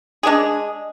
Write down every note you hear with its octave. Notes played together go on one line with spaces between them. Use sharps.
G#3 D4 G#4